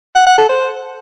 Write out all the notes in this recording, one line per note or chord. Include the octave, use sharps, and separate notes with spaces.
F#5
F#5
A4
C5